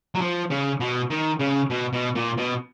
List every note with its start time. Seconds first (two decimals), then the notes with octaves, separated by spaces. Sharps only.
0.15 F#3
0.21 F3
0.51 C#3
0.80 B2
1.10 D#3
1.40 C#3
1.70 B2
1.93 B2
2.15 A#2
2.37 B2